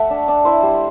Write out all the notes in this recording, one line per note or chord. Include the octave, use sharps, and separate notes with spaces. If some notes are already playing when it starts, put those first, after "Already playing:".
Already playing: A3 E5 F#5
D4
D4
E4 C5
G3